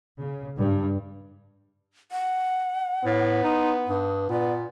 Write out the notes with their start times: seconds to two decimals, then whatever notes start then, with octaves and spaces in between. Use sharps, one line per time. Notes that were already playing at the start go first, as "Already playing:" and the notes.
0.20 C#3
0.58 G2
2.12 F#5
3.04 A2 B3
3.43 D#4 C6
3.87 G2 D#6
4.29 A#2 B3 D5